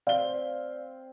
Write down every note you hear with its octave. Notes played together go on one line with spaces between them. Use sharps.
C4 D5 F5 G7